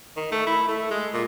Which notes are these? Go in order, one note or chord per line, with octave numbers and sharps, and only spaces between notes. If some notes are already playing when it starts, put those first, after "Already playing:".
D#3
A3
E4
A3
G#3
A#2